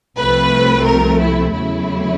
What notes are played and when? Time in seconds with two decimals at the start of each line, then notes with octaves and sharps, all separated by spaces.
0.18 C2 C3 F3 A3 B4
0.87 A#4
1.21 E4
1.54 E2 C#3 F#3 A3 E4